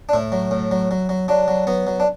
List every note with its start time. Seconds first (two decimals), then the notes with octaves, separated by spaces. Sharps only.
0.09 D4
0.13 A2 E4
0.32 F#3
0.51 A2
0.71 F#3
0.91 F#3
1.09 F#3
1.28 F#3 D4
1.48 F#3
1.67 F#3 B3
1.87 F#3
2.00 D4